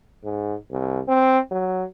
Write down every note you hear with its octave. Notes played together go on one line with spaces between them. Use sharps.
G#2
C2
C4
F#3